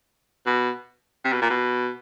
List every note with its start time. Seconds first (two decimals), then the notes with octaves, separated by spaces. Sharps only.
0.47 B2
1.25 C3
1.33 B2
1.42 A#2
1.50 B2